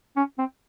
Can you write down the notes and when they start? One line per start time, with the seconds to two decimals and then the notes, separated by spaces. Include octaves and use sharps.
0.17 C#4
0.38 C4